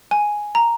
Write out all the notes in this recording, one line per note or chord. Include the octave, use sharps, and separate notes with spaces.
G#5
A#5